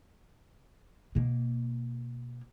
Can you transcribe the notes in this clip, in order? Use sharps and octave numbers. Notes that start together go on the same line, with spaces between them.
B2 A#3